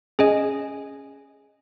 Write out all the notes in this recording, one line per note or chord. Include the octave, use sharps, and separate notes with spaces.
C#4 G#4 D#5 G#5